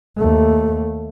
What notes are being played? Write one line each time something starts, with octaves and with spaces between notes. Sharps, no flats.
D#2 A3